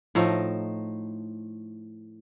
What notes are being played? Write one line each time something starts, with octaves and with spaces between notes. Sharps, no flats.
A2 F3 A3 D#4